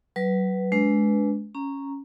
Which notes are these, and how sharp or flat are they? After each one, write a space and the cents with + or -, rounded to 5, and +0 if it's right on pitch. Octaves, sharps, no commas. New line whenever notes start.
F#3 +30 B4 +0
G#3 +25 D4 -25 B4 +0
C#4 -5 A#5 +0